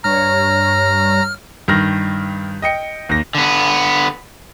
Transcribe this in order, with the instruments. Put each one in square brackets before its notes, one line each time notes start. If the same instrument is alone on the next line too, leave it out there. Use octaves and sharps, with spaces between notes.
[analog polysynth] G2 C#5 [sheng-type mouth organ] A#5 [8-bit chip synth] F6
[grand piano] G2 D#3 F6 A#6
D#5 G5 C#7
D#2 A#6
[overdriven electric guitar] D3 B3